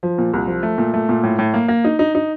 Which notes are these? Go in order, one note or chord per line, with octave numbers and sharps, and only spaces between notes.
F3
A#2
C2
F3
A3
A#2
A3
A#2
A2
A2
A#3
A#3
D#4
D#4
D#4